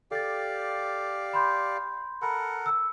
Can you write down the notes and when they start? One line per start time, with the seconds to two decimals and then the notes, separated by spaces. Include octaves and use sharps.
0.11 G4 A4 D5 F5 A6
1.33 B5 C6 G6
2.22 A4 A#4 F#5 B5
2.66 E6